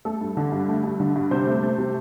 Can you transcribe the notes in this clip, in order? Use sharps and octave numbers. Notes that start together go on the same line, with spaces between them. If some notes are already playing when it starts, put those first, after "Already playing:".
A3 A4
G2
D3
G2
A3
G2
D3
G2
C3 C5
A3
A3
C3